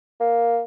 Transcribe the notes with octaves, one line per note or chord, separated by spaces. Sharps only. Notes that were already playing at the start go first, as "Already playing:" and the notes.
A#3